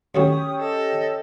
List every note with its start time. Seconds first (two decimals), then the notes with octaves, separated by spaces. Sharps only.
0.15 D#2 F#3 A3 C#4 G4 C#6 D#6
0.60 A4 D#5